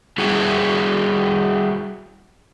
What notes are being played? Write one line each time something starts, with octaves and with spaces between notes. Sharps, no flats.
G3 E4 F#4 G#4